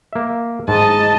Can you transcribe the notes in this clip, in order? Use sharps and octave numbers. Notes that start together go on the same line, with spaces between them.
A#3 E5
G#2 D#5 A5